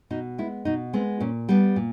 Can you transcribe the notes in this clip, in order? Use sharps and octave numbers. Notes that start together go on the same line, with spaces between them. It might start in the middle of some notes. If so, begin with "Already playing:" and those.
B2 D#4
G#3 B3 E4
B2 D#4
G#3 B3 C4
A#2 C#4
G3 B3 D4
A#2